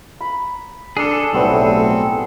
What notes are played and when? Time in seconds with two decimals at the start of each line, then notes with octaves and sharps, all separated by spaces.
0.21 A#5 B5
0.97 D4 G#4 A4
1.33 B1 A2 G3 B3 C4 C#5